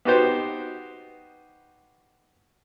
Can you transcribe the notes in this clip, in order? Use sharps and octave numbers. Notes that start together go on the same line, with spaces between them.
B3 D#4 F#4 G4 C5